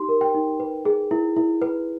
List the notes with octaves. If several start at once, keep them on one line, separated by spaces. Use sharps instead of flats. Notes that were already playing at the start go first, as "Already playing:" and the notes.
Already playing: D#4 G4 C6
A#4
G5
D#4
B4
G#4
E4
E4
B4